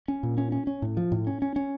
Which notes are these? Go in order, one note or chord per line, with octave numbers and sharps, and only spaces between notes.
C#4
A#2
C#4
C#4
C#4
A2
F3
A2
C#4
C#4
C#4